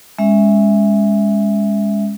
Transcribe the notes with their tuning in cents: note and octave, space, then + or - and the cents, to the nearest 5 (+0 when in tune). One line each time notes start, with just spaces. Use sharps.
G#3 -15 C#4 +0 E5 +0